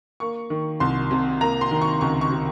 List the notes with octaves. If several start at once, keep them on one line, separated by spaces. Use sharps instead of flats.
A#3 C#6
D#3
C2 C6
C3
A#3 A#5
C6
D#3
C#6
C#2 C#6
C#6
C3